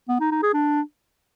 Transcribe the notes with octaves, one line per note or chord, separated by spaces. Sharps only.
B3
D#4
D#4
G#4
D4